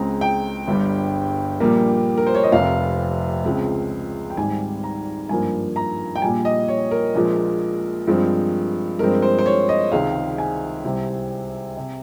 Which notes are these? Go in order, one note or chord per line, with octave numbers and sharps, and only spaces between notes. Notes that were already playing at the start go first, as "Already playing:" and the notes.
Already playing: C#2 C#3 G#3 C4 A#5
G5
G1 G2 G3
A#1 A#2 G3 A#3
A#4
C5
C#5
D#5
F1 F2 C3 F5
C#2 C#3 F3 G#3 C4
G5
G#1 G#2 G3 C4 G#5
A#5
G#1 G2 F3 A#3 G#5
A#5
G5
A#1 A#2 G3 G#5
D#5
C#5
A#4
A#1 A#2 F3 G#3
G2 F3 G#3 C4
G2 F3 G#3 C4 A#4
C5
C5
C#5
D#5
C#2 C3 D#3 G#3 C4 F5
G#5
C2 C3 G3 C4
C3